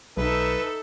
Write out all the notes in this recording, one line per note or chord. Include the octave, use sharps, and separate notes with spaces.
B1 D#4 A4 B4 E5